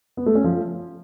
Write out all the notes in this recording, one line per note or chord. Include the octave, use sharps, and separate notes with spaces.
B3
A3
C#4
F3